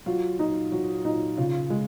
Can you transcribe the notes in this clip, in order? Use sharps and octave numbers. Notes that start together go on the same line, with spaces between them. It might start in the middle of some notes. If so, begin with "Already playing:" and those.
F#3 F4
A#2 D#4
F#3
A#2 D#4
C#3 F4
G#3